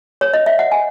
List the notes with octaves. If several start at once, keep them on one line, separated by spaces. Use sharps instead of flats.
C#5
D#5
E5
F#5
G#5